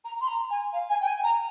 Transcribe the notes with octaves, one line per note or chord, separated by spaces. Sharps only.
A#5
C6
A#5
G#5
F5
G#5
G5
G#5
A#5